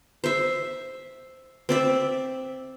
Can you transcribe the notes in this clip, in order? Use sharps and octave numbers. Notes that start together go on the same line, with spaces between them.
C5 E5
C4 D5 E5